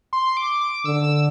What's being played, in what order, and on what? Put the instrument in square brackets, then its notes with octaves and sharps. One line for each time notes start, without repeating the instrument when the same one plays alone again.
[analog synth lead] C6
D6
D6
[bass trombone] D3 [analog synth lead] E6
[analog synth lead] E6